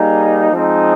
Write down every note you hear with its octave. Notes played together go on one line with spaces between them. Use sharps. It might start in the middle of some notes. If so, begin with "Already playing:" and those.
Already playing: G3 A#3 D#4 G#4
F3 G#3 C4 D#4